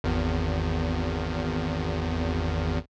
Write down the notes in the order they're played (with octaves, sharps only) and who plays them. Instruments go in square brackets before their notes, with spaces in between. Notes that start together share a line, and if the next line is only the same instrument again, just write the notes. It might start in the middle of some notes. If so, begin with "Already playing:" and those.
[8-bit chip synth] G#1 E2